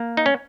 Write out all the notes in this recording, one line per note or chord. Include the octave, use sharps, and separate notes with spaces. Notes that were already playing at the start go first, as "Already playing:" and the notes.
Already playing: A#3
D#4
C#4